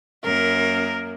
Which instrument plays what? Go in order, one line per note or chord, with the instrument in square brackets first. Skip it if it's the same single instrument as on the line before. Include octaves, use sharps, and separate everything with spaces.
[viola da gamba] F#2 A#3 [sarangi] A#4